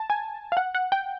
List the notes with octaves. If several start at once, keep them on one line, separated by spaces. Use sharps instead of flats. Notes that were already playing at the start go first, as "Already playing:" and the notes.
Already playing: A5
G#5
F5
F#5
F#5
G5